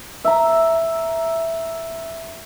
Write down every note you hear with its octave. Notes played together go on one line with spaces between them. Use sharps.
E5 A#5